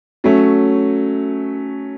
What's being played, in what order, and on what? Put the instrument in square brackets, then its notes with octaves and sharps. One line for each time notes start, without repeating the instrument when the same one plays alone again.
[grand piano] F#3 A3 C#4